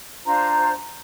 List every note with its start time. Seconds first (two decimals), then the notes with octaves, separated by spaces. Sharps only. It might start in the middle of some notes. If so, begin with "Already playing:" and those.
0.25 D4 F4 C5 A#5